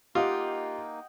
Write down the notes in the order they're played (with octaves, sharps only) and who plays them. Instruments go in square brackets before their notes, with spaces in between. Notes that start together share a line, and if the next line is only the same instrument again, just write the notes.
[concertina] A#3 D#4 [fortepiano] F4 [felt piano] G4 [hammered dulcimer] D#5 F#5 G5